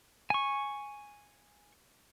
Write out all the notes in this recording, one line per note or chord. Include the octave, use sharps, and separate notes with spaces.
G#5 C#6